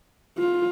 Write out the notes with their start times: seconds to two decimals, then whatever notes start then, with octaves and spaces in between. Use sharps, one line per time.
0.38 F4